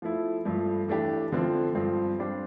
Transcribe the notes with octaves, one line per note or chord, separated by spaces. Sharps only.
F3 A3 E4
G2 F3 A3
E3 A3 D4 G4
D3 F3 A3 C4
G2 F3 C4
G3 D4 G4 C5